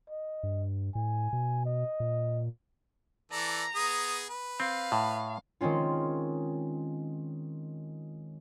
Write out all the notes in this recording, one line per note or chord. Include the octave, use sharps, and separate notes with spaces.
D#5
G2
A2 G#5
B2
D#5
A#2
E3 A4 D5 A#5
B3 G#4 D#6
B4
C4 F5
A2
D#3 G#3 C4 C#4 F4